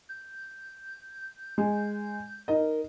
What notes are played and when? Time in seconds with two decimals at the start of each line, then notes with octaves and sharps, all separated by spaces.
0.09 G6
1.58 G#3
2.48 D#4 A#4 D#5